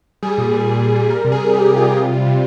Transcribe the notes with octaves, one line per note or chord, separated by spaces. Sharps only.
G3 G#4
A#2
G3
G3
A#2
G3
G3 A#4
C3
G#4
C3
C3 G4
G3
F4
G3
C3
G3
C3